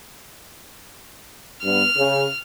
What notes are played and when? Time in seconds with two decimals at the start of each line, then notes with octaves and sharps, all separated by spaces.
1.64 G2 B3 F6
1.97 C#3